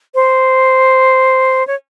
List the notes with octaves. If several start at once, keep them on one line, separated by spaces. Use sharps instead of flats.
C5
C#5